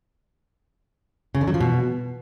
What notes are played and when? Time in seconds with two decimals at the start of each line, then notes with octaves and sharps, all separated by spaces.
1.35 C#3
1.41 D3
1.48 F#3
1.54 F3
1.61 B2